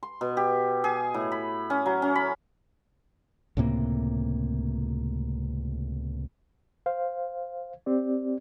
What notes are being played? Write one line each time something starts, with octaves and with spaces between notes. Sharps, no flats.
C6
B2
G4
G#4
A2
B5
C#4
F#3
C#4
B5
C#2 A2 C3 A#3
C5 F5
C4 G4 D5